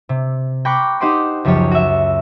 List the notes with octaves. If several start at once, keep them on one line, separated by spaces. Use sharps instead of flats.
C3
G5 A#5 B5 C#6 D6 F#6
D#4 G4 C5 F#5 C6 D6
C#2 F#2 F3 G4 C#5
F#4 E5